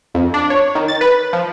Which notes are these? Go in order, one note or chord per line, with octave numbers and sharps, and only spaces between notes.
F2
D4
C#5
D#3
A6
B4
F3